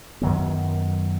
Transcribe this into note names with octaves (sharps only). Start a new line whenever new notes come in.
F#2 D#3 F#3 B3